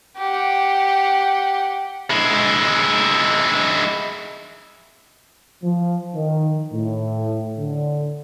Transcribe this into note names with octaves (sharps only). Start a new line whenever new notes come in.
G4 F#5
G#3 E4
F3
D#3
A2
D3